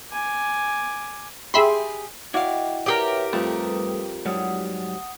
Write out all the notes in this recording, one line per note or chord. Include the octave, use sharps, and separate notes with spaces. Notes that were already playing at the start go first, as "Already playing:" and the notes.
G#5 D6
G4 G#4 E5 B5 C6
E4 F#4 D5 D#5 F5 G5
G4 G#4 A#4 B4 C#5 D5 E5 G5
F2 G3 A3 B4 D#6
G#2 F#3 G3 F#5 D#6